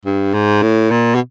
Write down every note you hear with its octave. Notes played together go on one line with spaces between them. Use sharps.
G2
G#2
A2
A#2
B2